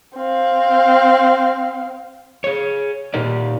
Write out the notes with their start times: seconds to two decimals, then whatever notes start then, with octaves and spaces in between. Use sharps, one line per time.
0.18 C4 F5
2.44 G#4 C#5
3.14 A#2 D#4 G4 A#4 D5